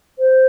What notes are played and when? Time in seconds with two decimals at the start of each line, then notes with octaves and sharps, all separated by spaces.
0.19 C5